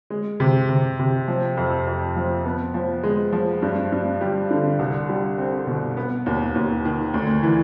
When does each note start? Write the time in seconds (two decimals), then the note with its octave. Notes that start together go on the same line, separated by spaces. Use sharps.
0.10 G#3
0.40 C3
0.69 C3
0.99 C3
1.28 F3
1.57 F2
1.87 F2
2.16 F3
2.45 B3
2.74 F3
3.03 G#3
3.33 F3
3.62 G2
3.92 G2
4.21 G3
4.51 D3
4.79 C2
5.09 G3
5.38 C4
5.67 B2
5.97 B3
6.26 D#2
6.55 D#2
6.85 D#3
7.14 D2
7.43 E3